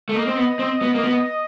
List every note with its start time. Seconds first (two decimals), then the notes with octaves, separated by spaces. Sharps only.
0.09 A3
0.15 A#3 D#5
0.27 C4
0.37 B3
0.59 C4
0.82 B3
0.95 A#3
1.04 B3